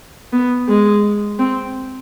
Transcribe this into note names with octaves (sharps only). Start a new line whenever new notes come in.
B3
G#3
C4